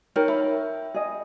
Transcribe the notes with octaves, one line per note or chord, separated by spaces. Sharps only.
D#4 A#4 C#5 G5
E5 B5
G#4 D#5